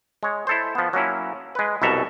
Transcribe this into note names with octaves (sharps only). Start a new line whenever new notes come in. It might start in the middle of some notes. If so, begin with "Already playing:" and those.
G#3 C#5
E4 A4 C5
F3 B3
F#3 A#3 C#4 E4
G#3 B4
C2 F#2 B2 A4 E5 A#5